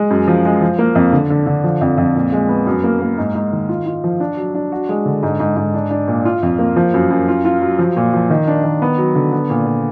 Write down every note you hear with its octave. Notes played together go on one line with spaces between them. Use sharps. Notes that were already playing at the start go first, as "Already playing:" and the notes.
Already playing: G#3
F#2
F3
G#3
F3
A#3
F2
D3
D3
D3
F3
F2
F2
A#2
G#3
B3
F#2
A#3
A#3
G#2
G#2
D#3
F4
F4
F3
D4
F#3
D4
F#4
G#3
D3
G#2
G#2
G#2
D4
D4
A#2
F4
F2
A#3
F3
F#2
F#2
F4
F4
F#3
F3
A#2
F3
D#3
D4
D#3
B3
F#3
D3
B3
A#2
A#2